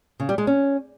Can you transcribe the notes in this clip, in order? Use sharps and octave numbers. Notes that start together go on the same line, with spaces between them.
C#3
G3
G#3
C#4